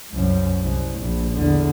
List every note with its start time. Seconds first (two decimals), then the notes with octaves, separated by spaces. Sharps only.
0.11 C2 F#2
0.60 C2
0.99 A#1
1.34 E2 D3